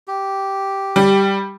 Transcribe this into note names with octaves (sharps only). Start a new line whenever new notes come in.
G4
G3